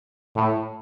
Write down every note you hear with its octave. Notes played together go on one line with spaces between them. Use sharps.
A2